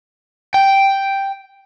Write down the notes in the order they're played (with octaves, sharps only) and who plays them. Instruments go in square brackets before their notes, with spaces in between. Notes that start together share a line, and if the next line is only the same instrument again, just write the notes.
[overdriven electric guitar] G5